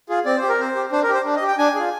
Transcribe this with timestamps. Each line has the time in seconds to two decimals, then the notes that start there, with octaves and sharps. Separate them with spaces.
0.09 F4 G#4
0.26 C4 D5
0.37 C5
0.42 G4
0.49 A#4
0.59 C4 C5
0.76 G4
0.92 D4 C5
1.03 A#4
1.09 G4
1.14 C5
1.25 D4
1.36 D#5
1.42 G4
1.48 G5
1.58 D4 G#5
1.75 F4 G#4